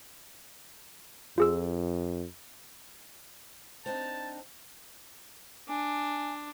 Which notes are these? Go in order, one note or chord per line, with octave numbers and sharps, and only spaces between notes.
F2 F4 G#4 E6
C4 D4 D#4 A5
D4 G#5